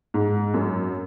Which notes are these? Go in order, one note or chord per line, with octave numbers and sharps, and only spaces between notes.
G#2
F#2